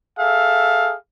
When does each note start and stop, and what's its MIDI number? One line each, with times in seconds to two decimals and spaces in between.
0.19 0.94 68
0.19 0.94 69
0.19 0.94 76
0.19 0.94 77